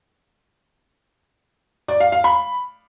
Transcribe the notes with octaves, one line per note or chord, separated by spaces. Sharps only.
D5
F5
F5
B5